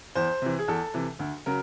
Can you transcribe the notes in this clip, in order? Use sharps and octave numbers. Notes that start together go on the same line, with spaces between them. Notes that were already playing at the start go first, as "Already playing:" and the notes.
E2 C5
C3 E3
G#4
E2 A4
C3 E3
D2
C#3 F#3 A#4